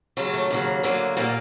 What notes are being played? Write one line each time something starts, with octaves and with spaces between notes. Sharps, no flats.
D#2 C#3 F#3 G#3
A3
D#2 C#3 F#3 A#3
D2 D3 F#3 A#3
A#2 G3 A#3